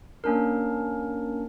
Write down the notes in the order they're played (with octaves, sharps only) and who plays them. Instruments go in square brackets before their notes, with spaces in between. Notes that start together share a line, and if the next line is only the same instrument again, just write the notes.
[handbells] A#3 C#4 D4 A#4